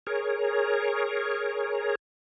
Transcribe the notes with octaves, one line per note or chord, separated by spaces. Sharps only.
G#4 A#4 C#5